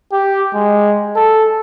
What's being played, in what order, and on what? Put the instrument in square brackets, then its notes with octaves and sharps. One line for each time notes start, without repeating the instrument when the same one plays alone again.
[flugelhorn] G4
G#3
A4